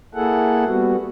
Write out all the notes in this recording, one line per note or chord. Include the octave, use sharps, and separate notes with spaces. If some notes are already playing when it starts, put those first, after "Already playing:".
A#3 E4 G#4 A4 F#5
G3 B3 F#4